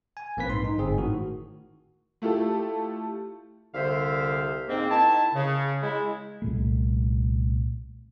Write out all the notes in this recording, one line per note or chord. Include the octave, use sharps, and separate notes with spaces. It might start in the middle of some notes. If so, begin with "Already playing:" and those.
G#5
A#1 A#3 C4 B4 B6
G#2 C6
D#4
G1 G#2 C4 G#4
A2 D#3 F#4
A3 E4 F4 G4 A4
C2 D3 C5 E5 F5
G#2 A#3 C4
D#3 E4 A5
C#3
G#3 E4
C2 A#2 A3